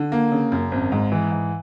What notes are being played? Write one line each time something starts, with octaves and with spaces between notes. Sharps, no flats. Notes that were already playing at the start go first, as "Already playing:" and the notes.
Already playing: D3
A#3
C#3
F#2
G#1
G#2
E3
G#2